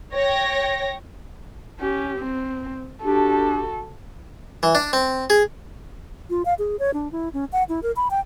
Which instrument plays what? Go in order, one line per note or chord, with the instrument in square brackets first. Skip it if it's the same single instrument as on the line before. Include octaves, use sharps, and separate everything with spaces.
[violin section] C#5 G5 A#6
[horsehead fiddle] C#4 G4
C4
[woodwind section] D4 G4 [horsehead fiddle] F#4 A4
[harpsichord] E3
D4
C4
G#4
[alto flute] F4
F5
G#4
C#5
D4
E4
C#4
F#5
E4
A#4
B5
G5